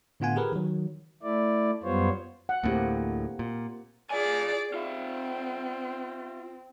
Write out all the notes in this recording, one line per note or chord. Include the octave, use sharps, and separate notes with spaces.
A2 D3 B3 F4 F#5 G#5
G4 G#4 A#4 B4
D#3 F#3
A3 E4 D5
F#2 G3 B3 F4 C5 C#5
F#5
D2 A2 A#3 C4 G4
A#2
F4 G#4 D5 G#5
C4 F4 E5